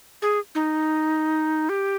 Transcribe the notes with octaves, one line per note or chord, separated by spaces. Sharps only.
G#4
D#4
G4